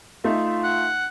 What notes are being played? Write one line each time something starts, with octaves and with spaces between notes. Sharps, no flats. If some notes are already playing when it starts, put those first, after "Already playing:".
A3 D#4 F4 E5
F#5